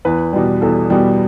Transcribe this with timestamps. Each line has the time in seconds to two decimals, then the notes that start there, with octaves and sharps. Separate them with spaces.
0.05 E2 B4
0.33 B2 G3
0.62 E2 A4
0.90 B2 G3